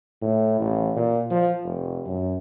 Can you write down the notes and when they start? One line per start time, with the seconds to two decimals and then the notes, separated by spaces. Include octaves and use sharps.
0.22 A2
0.60 A1
0.96 A#2
1.30 F3
1.63 F1
2.06 F#2